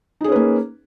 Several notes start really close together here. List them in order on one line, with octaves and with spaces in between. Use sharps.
D#4 G#4 C#4 B4 A#3